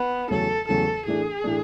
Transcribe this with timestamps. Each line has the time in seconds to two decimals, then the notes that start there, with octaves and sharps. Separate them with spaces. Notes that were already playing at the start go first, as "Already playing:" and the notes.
Already playing: B3
0.30 E2 C#3 F#3 A3 C#4 A4
0.68 E2 C#3 F#3 A3 C#4 A4
1.06 A2 E3 A3 D4 G#4
1.44 A2 E3 A3 D4